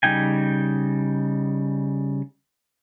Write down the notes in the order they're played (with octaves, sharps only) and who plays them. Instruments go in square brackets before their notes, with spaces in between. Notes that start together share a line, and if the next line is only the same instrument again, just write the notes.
[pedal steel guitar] C#3 G3 D#4 G5 G#5